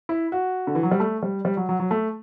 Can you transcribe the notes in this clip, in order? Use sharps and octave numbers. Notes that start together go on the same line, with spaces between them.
E4
F#4
D3
E3
F#3
G3
A3
G3
G3
F#3
F#3
F#3
A3